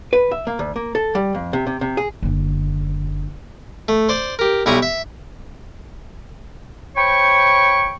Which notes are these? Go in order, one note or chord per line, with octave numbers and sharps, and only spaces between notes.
B4
E5
A#3
D2
A#3
A4
G3
F2
C3
C3
C3
G#4
F#1 D3
A3
C5 D5
G4 A#4
B1 G3 E4 A#5 C#6 D#6
E5
C5 C#5 G5 B5 C#6